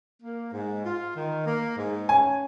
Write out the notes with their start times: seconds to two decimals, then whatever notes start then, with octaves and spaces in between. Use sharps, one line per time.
0.23 A#3
0.53 G#2
0.85 F4
1.16 D#3
1.47 A#3
1.77 G#2
2.09 C#4 G#5